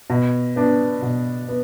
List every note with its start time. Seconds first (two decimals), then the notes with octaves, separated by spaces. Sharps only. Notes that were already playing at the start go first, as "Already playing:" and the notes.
0.10 B2
0.56 B3 D4
1.02 B2
1.48 B3